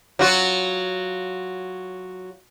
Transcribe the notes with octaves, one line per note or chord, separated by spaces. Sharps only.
F#3 F4 F#4